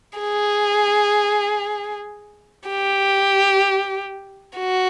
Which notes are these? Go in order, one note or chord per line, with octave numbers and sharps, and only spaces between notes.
G#4
G4
F#4